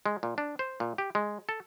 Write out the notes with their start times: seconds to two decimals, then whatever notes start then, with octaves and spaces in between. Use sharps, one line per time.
0.06 G#3
0.23 A#2
0.38 D4
0.59 C5
0.80 A#2
0.98 G4
1.15 G#3
1.49 A4